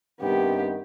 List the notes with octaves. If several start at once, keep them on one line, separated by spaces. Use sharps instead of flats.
G2 C3 D#3 B3 G4